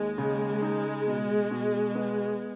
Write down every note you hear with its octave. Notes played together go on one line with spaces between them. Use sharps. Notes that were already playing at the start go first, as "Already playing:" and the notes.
Already playing: D#2 G#3
C#3
D#4
B2
B2
B3